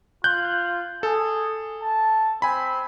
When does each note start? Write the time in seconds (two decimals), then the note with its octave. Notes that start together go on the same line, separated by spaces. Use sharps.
0.24 F4 F#6 G6
1.03 G#4 A4
1.82 A5
2.42 C4 G#5 B5